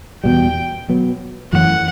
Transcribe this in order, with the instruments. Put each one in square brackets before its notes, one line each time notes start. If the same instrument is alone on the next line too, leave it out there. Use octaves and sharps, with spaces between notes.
[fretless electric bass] E2 B2 G3 [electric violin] G5
[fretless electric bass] B2 F#3 B3
[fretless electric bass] F#2 E3 A3 C#4 [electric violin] F#5